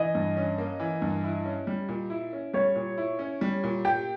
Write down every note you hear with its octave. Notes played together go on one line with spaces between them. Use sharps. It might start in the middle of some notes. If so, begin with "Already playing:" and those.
Already playing: E3 D#5
G2
C#4
A#3
E3
G2
E4
C#4
G3
A#2
E4
C#4
G3 C#5
A#2
E4
C#4
G3
A#2
G4 G5